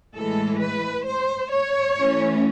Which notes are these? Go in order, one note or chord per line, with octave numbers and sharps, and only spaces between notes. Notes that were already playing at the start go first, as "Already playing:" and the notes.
A2 E3 G#3 A4
B4
C5
C#5
E3 A3 C#4